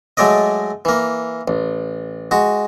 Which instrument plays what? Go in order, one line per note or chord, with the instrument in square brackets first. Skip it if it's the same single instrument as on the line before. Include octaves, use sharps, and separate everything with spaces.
[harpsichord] F#3 G#3 A3 D5 D#5
E3 A#3
A1
G#3 F#4